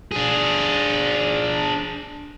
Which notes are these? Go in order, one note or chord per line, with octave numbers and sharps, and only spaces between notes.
D4 G#4